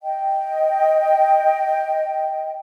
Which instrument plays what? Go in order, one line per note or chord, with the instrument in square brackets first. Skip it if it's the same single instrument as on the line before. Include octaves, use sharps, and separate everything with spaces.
[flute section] D#5 G5